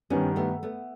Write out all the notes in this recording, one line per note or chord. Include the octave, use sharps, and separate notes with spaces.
G2 D#3 G3 B3 C#4
A3 B3
A3 B3